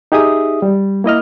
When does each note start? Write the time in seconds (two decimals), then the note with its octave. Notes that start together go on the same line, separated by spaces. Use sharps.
0.12 D#4 G4 G#4 E5 D#6
0.62 G3
1.04 A#3 E4 D#5 F6